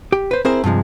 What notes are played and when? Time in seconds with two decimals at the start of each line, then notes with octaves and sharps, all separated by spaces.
0.12 G4
0.31 B4 C5
0.45 C4 E4 G#4 A#4 C5
0.64 G2 C3 F3 G#3